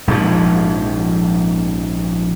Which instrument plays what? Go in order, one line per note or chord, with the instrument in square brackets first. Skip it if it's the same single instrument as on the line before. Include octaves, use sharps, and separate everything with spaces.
[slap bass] A#1 G#2 D3 F3